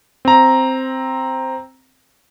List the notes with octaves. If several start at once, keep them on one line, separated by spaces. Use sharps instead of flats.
C4 A#5